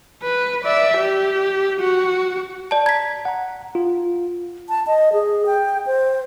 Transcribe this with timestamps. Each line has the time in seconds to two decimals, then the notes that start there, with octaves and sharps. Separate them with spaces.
0.23 B4
0.64 D5 E5
0.97 G4
1.80 F#4
2.71 D5 A5
2.86 A#5 G#6 B6
3.25 F#5 A#5
3.75 F4
4.69 A5
4.87 D#5
5.13 G#4
5.46 G5
5.87 C5